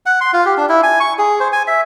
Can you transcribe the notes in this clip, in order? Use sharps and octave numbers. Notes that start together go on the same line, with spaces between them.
F#5
C6
F4
G4
D4
E4
G#5
C#6
G#4
C5
G#5
E5